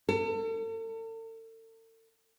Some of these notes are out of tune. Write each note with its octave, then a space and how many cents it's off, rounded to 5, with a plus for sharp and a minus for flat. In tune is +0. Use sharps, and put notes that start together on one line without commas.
A4 +40